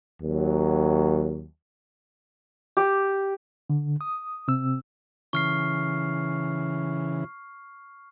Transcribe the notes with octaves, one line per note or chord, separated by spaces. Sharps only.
D#2 F#3
G4
D3
D#6
C3 C4 E6
C#3 E3 C#6 F6 C7